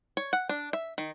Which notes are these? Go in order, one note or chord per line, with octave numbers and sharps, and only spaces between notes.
C#5
F#5
D4
E5
D#3